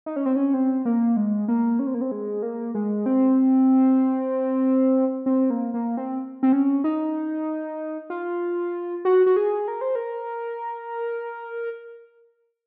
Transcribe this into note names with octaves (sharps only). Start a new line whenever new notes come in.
D#4
C#4
C4
C#4
C4
A#3
G#3
A#3
C#4
C4
A#3
C4
G#3
A#3
G#3
C4
C4
A#3
A#3
C4
C4
C#4
D#4
F4
F#4
F#4
G#4
A#4
C5
A#4